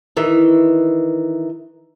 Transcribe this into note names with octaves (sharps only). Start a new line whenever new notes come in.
D#3 E3